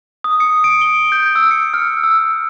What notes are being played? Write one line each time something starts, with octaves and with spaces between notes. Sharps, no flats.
D#6
C#7
D7
G7
G6
E6
C#7
F6
E6